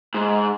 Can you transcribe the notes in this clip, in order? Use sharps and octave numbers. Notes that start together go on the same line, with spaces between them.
G#2